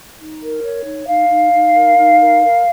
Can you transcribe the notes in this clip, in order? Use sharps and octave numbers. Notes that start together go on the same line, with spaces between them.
D#4
A#4
C#5
D#4
D#4 F5
D#4
D#4
A#4
D#4
A#4
A#4